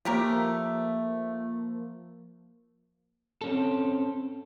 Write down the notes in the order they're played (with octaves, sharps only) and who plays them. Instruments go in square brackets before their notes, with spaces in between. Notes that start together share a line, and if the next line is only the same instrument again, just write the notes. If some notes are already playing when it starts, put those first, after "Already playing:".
[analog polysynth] F3 A#3 [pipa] A3 G4 A#4
[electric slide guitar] C4 C#4 A4